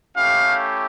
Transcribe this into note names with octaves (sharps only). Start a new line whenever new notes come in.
A3 C#4 E4 G4 F5